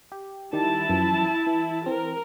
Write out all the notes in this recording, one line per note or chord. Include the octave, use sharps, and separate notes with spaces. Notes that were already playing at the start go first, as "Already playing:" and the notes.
G4
D#3 G3 E4 G4 A5
F#2 E3 F3
E3
E3 C4 A#4